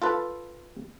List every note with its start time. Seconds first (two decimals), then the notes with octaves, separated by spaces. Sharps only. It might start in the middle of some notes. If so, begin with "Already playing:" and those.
0.02 F4 A4 B4